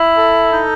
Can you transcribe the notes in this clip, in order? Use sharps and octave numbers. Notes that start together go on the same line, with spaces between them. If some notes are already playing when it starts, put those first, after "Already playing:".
Already playing: E4
A4
D#4